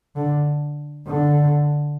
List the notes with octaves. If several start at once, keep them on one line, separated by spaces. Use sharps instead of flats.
D3
D3